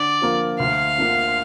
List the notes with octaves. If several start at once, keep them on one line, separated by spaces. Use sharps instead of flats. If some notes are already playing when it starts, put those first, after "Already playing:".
Already playing: D3 D5
F3 A#3 F4
D2 F5
D3 A#3 D4 F4